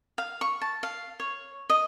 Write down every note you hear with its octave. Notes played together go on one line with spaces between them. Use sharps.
F5
C#6
A5
F5
C#5
D#5